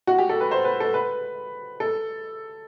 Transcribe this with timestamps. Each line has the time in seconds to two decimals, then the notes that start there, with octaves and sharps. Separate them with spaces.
0.07 F#4
0.18 G4
0.29 A4
0.41 B4
0.51 C5
0.65 B4
0.80 A4
0.94 B4
1.80 A4